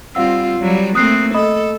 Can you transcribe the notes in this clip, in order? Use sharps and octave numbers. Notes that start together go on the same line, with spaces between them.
G3 C4 F4 F5 F#5 E6
F#3 G3
A3 A#3 C4 D#6 F#6 C7
A4 D#5 B5 D#6